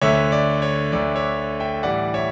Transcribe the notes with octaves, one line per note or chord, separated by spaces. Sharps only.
D2 D3 A3 C#5 E5
D5
C#5
D2 D3 A3 D5
C#5 E5
E5 G5
A2 E3 G3 D5 F#5
C#5 E5